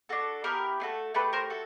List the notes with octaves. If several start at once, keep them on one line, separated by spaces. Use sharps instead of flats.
D4 F#4 A4
B3 E4 G4 A#4
A3 D4 F#4 A4
A3 D4 G4 A4 B4
A#4 C5
F#4 A4